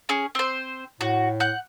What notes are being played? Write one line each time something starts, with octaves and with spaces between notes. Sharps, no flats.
C#4 G#4
C4 C5
A2 F#4
F#5 F#6 G6